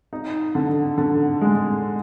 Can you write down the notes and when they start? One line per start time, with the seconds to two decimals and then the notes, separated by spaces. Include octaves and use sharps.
0.13 D#4
0.55 D3
0.98 D3
1.41 G#3